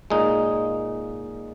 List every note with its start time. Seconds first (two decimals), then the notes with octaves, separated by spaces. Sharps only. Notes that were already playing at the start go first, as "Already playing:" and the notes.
0.10 A#2 G#3 D#4